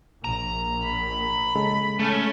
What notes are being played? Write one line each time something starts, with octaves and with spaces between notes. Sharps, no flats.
A#1 A#5
B5
C#3 G#3 A4
A3 C#4